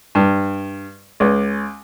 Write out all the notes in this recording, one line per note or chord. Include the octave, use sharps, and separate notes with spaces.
G2
C#2